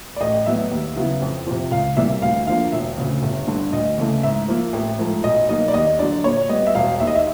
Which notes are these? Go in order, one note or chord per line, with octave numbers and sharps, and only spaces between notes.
D5
A1 D#5
A2 F#3 B3 E5
D#2
C#3 F#3 B3 E4
F2
C3 F3
C#2 F5
C3 E3 G3 A#3 E5
D2 F5
D3 F3 A#3 F5
E1 E5
D2 C#3
G1
G2 D3
D2 D#5
C#3 E3 A3
G#2 E5
F3 A#3
A1
G#2 F3 A3
B1 D#5
B2 F#3 A#3 D#4 D#5
D5
D#2 D#5
D3 F#3 D5
A#2 C#5
G3 B3 D#5
E5
E1 F5
D#2 D#3 E5
D#5
E5